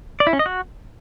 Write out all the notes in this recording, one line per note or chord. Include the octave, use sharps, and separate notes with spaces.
D5
E4
C#4
D#5
F#4